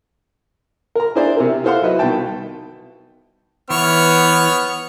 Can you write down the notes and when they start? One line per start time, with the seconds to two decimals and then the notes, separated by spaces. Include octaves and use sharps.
0.95 A#4 A#5
1.16 D4 E4 G#4 C5 D5 E5
1.37 C3 E4 A#4
1.64 E4 A4 C5 F5 F#5 C6
1.82 F#3 E4 B4 D#5 E5
1.99 C2 B2 D#3 B3 G5 A5
3.70 E3 B3 C#5 F6